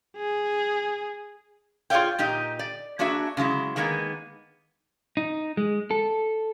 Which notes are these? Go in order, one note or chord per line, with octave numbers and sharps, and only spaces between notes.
G#4
F4 G#4 C#5 D5 F5 G5
A#2 D#4 G4 D#5
D5
A#3 D4 F#4 G#4 E5
C#3 F#3 G#3 E4
D#3 G#3 A#3 B3 D#4
D#4
G#3
A4